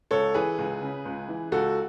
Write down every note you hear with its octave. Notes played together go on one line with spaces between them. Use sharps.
C#2 A4 C#5
E3 G#4 B4
C#2
C#3
C#2
E3
C#2 F#4 A4